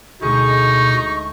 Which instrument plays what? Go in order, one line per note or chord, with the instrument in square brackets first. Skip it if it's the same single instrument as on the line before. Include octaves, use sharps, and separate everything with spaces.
[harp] D2 G#3 G#4 [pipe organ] B2 [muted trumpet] D#4 [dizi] C#6